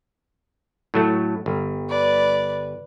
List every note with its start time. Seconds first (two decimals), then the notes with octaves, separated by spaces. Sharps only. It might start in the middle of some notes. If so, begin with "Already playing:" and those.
0.94 A2 F#3 A3
1.46 G1
1.89 B4 D5